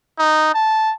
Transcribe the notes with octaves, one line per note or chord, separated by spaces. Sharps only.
D#4
A5